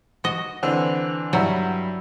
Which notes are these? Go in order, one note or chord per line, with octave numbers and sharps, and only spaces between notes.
F#4 D#5
D3 E3 C4
G2 F#3 E4